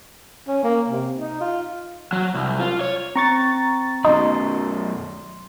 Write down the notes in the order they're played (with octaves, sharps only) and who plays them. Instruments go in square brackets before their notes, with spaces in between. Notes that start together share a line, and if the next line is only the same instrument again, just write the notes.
[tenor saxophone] C#4
A#3
C3
D#4
F4
[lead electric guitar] F#3
C2
F4
C#5
[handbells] C4 [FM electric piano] A#5 C#6 A6
[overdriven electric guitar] B1 F#2 [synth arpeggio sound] D#4 [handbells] C6